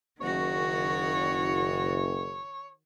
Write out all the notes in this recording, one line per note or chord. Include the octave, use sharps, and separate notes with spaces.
F#1 D#3 F#4 C#5